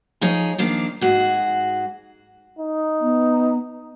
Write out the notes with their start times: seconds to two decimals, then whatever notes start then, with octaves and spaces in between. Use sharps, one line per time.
0.21 F3 D#4 G#4 C#5
0.58 D#3 F3 A#3 D4
1.01 G#2 F#4 G#4
2.59 D#4
3.01 B3